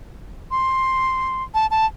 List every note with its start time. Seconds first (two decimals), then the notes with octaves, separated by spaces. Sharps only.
0.51 C6
1.54 A5
1.71 A5